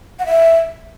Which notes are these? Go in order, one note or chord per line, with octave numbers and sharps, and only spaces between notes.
F#5
E5